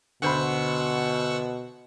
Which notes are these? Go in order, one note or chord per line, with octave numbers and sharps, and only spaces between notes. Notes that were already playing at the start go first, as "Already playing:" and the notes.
D2 B2 C5 F#5 B5 C#6 E6